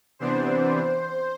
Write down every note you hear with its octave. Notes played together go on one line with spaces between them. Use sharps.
C3 E3 B3 D4 C5